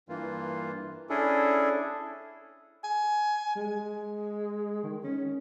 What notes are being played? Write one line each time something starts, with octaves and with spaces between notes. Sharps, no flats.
G2 E3 A#3 F4
C#4 D4 E4 G#4 A4
G#5
G#3
D#3
C#4